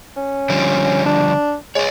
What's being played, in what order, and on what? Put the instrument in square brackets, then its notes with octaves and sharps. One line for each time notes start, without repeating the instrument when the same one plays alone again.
[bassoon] C#4
[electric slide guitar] D3 F3 G3
[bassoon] D4
[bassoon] G#3 [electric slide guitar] C#5 D#5